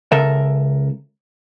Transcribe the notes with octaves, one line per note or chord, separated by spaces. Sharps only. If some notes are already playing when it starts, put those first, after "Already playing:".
C#2 C#3 A4 A#4 E5